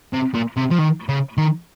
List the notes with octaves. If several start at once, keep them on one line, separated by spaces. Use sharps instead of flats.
C3
A#2
C3
F3
D#3
C#3
D#3